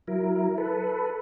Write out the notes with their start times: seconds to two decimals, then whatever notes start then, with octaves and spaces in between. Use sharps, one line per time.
0.08 F#3 E4 A#4
0.58 A4 B4